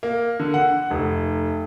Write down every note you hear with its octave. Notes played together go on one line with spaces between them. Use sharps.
A#3
D3
F#5
F1